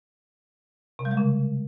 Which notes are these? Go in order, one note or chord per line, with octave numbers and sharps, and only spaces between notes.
C3
G3
G#3
C#3